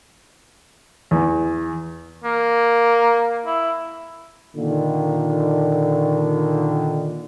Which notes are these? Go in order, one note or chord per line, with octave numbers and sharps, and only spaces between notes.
E2
A#3
E4
A#2 D3 D#3